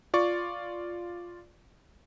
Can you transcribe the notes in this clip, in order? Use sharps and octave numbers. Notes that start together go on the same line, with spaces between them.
F4 D5 C#6